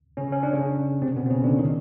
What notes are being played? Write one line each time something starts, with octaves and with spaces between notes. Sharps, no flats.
C#3 C#4
C#4
D4
C#3 C#4
C3 C4
B2 B3
C4
C#3 C#4
D3 D4
D#3 D#4